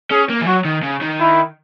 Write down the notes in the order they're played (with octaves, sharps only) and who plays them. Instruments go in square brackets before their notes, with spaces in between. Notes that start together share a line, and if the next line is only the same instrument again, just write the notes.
[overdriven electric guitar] C#4 [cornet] G#4
[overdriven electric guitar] A#3
E3
[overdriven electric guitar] F#3 [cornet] F#4
[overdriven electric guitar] D#3
C#3
D#3
[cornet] E4